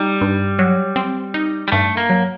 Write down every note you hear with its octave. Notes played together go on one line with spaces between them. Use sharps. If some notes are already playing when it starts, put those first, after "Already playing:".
Already playing: G3 D#4
G2
F#3
C4
D#4
G3
G2 A3
A#3
F#3